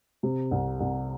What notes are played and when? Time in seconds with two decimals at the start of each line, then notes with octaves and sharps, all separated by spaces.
0.23 C3
0.51 C2
0.80 C2